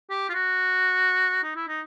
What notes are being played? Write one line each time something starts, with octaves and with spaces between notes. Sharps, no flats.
G4
F4
F#4
D#4
E4
D#4